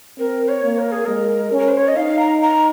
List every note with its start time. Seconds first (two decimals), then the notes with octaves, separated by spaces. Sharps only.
0.18 C4 A#4
0.48 C#5
0.63 A#3
0.79 A#4
0.92 G#4
1.05 G#3 A#4
1.52 C#4
1.58 A#4
1.68 C5
1.77 C#5
1.88 D#5
1.96 D#4 F5
2.19 A#5
2.42 A#5